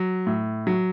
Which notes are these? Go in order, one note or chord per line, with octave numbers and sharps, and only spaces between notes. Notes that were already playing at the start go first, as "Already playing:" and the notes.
Already playing: F#3
A2
F#3